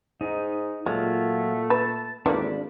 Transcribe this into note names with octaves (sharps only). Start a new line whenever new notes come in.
G#2 D#4
A#2 F#3 G#3 A3 F4
B4 A5
G#1 E3 A3 A#3 D4 B5